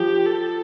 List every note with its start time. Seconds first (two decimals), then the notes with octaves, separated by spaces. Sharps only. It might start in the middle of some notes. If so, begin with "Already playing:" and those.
Already playing: F3 G4
0.25 A4